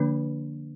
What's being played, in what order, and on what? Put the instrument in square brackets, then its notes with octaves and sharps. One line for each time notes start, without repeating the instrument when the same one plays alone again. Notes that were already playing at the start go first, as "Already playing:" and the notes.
Already playing: [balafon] D3 F3 A#3 D4 B4